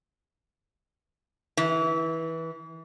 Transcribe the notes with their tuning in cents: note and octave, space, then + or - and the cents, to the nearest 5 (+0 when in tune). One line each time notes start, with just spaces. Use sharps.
E3 -20